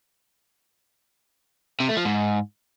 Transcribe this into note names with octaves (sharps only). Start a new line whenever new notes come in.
C3
A3
F3
G#2